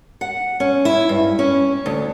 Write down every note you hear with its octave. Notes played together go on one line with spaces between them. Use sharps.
F#5
C#4
E4
G2
C#4
D2